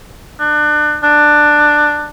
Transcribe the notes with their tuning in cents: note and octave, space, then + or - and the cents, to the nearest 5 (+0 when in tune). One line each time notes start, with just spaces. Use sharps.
D4 +30
D4 +15